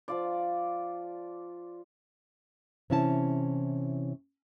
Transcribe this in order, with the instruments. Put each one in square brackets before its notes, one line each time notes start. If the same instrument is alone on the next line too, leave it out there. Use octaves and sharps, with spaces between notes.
[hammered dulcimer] F3 F4 D5
[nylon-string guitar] C3 E3 C#4 E4 E5 A5